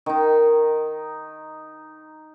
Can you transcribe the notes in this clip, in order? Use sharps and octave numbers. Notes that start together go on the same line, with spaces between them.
D#3 D#4